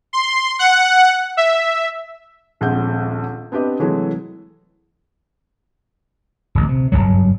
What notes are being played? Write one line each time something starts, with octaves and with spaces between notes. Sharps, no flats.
C6
F#5
E5
D#1 A#1 G#3 C4 F#5 G6
B3 C4 D4 G4 B4 D#5
C3 E3 F#3 G#3 A3
D1 A1
C3
F#1 E2 G2 F#3